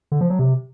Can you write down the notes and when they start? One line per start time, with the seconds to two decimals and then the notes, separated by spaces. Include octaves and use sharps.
0.12 D3
0.21 F3
0.30 F#3
0.39 C3